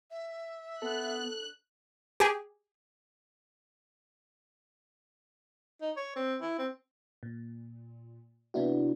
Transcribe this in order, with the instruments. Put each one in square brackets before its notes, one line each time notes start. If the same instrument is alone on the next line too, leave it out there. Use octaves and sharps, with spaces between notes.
[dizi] E5
[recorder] B3 [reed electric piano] A4 [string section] F#6
[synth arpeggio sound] G4 G#4
[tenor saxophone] D#4
C#5
C4
E4
C4
[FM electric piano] A#2
C3 B3 D4 E4 F#4